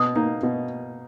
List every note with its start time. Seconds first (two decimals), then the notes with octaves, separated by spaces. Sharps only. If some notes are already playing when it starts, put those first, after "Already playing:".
Already playing: B2 D#6
0.16 A#3 D#4
0.43 B2